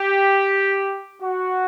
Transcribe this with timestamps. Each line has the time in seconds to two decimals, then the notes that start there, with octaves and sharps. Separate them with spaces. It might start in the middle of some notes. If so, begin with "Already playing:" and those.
Already playing: G4
1.22 F#4